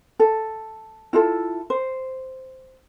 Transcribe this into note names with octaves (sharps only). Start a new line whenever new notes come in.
A4
E4 F4 A4
C5